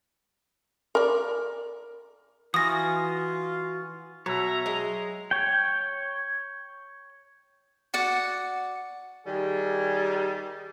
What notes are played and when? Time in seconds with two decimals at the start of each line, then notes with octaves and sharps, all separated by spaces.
0.95 A#4 D5
2.54 E3 F4 F#4 G#5 D#6 A#6
4.26 B2 F#3 C#5 E5 A#5
4.66 G#3
5.31 C#5 G5
7.94 F#4 D5 F#5
9.26 D#3 G3 G#4